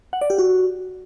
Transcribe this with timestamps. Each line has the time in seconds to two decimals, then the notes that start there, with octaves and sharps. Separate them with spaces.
0.13 F#5
0.21 D5
0.30 G4
0.38 F#4